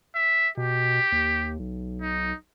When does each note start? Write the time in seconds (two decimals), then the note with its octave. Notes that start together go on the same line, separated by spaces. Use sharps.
0.15 E5
0.57 B2 G4
1.12 D#2
1.59 B1
2.02 D#4